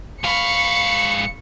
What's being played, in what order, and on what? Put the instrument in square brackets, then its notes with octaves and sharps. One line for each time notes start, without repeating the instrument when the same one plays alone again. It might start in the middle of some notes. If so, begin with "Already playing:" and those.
[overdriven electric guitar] G#2 F5 [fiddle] B5 C#6 [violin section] C#7